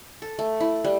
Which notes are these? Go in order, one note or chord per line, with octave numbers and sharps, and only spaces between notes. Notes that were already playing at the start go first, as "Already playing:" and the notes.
A4
A3
E4
G3